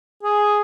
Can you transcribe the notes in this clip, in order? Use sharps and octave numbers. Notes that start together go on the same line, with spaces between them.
G#4